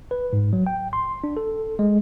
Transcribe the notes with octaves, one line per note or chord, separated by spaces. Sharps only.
B4
G#2
F#3
G5
C6
D4
A4
G#3